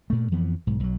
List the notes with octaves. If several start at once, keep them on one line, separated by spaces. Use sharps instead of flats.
G2 A#2 A3
F2 E3 F3 B3
B1 G#2
B1 F#3